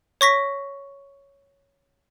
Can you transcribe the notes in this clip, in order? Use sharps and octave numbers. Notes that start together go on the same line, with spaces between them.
C#5 C#6 A#6 B6